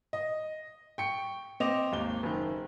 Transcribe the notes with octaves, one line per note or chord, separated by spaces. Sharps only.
D#5
G5 C#6 C#7
C4 D#5 D6 F7
G#1 D#2 G7
F#1 D#3